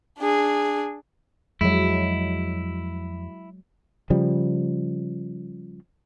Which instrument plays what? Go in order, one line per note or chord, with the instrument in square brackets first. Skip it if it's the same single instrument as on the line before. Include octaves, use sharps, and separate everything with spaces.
[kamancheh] D4 G#4
[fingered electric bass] F2 [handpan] F#3 G#3 [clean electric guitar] E4
[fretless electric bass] C#3 F3 G3